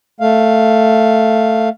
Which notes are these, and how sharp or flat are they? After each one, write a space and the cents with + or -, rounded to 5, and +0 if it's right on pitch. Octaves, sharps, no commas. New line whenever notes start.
A3 +5 F5 +0